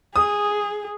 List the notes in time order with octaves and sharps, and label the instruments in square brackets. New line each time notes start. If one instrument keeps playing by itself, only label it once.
[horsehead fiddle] G#4 [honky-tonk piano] D#6